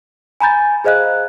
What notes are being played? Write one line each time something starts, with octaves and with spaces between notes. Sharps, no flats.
G#5 A#5 B5 G6 A6
G#4 C5 D#5 F5 F#6